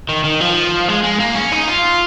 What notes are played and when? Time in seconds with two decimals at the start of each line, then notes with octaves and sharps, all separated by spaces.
0.09 D#3
0.25 D#3
0.41 F3
0.89 G#3
1.03 G#3
1.20 A#3
1.35 C#4
1.52 D#4
1.68 F4